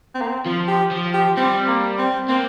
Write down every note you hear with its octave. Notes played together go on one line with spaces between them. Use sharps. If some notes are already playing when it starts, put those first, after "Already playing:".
C4
A#3
C4
F3 F4
G4
F3
G4
G3 C4
A#3
C4
A#3 C4